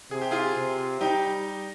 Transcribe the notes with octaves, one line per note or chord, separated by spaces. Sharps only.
C3 G#4
G4
F4 G#4
C3
G3 D#4 G4